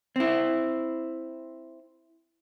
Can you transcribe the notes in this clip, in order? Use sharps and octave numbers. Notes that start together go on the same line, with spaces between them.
C4 E4